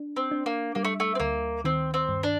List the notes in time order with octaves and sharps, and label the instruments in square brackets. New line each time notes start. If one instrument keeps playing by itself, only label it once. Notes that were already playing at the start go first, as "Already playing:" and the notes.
Already playing: [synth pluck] D4
[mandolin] C4
[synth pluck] D4
[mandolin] A#3
[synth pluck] G3 [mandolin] A#3
[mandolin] A3
A3
C4
[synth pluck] D2 [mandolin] A#3
[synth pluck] D#3 [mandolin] C4
[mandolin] C4
[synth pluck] G2
[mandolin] D4